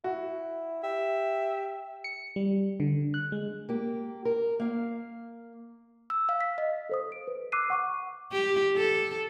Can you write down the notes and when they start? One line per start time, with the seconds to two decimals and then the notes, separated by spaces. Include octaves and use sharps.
0.04 E4 F#4
0.83 G4 E5
2.04 C#7
2.36 G3
2.80 D3
3.14 F#6
3.32 G#3
3.69 A#3 G4
4.25 A#4
4.60 A#3 F5
6.10 E6
6.29 F5
6.41 B6
6.58 D#5
6.89 A4 C5 D#6
7.12 D7
7.28 B4
7.52 D6 E6 F#6 C7 D#7
7.70 F#5 C#6 D6
8.32 G4
8.77 A4